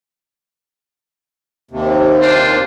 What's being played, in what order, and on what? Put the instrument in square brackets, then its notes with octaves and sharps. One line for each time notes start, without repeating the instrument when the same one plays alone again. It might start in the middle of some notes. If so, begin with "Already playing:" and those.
[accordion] D#2 C3
[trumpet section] D4 F4 C5